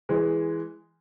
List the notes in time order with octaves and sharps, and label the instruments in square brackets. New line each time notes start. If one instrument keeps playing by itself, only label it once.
[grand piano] E3 G#3